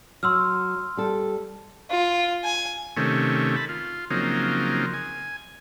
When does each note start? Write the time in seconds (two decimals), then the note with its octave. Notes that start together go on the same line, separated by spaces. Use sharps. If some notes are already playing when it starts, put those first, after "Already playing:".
0.23 F#3 C6 E6 F6
0.97 G3 A4
1.90 F4
2.44 G#5
2.97 C3 D#3 A3 C#4
3.56 A5 B5
3.69 F4
4.10 C#3 F3 F#3 A#3 C4 D#4
4.94 G#5